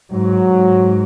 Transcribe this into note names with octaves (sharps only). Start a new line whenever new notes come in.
G#2 F#3
G#2